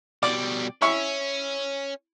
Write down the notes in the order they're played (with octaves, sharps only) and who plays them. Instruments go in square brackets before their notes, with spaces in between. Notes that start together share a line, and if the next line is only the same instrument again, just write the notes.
[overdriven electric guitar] B2 G3 [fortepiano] D5
[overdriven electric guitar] C#4 [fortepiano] E4 C#6